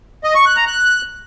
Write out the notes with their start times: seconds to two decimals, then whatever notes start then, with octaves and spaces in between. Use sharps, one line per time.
0.24 D#5
0.35 C#6
0.46 F#6
0.56 A#5
0.67 F#6